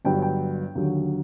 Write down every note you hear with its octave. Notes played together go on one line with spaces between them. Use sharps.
G1 G2 F#3 G5
G5
D#2 D3 F#3